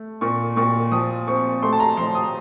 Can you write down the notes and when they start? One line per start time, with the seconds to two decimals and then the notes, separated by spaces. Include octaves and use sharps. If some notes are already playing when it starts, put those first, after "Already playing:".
Already playing: A3
0.21 A#2 C#6
0.56 A#2 C#6
0.92 F3 D#6
1.27 C4 C#6
1.62 A3 C6
1.73 A5
1.80 A#5
1.97 F3 C6
2.15 D#6